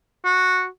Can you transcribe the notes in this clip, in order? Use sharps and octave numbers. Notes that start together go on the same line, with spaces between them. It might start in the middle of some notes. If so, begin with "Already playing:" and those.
F#4